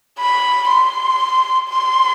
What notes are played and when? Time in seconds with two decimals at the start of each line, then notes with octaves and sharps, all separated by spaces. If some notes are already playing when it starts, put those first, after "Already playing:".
0.19 B5
0.68 C6
1.70 C6